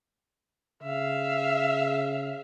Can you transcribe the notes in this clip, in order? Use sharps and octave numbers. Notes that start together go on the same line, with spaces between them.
C#3 E5 F5